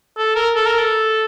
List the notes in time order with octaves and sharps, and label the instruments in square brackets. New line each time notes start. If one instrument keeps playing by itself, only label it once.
[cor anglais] A4
A#4
A4
A#4
A4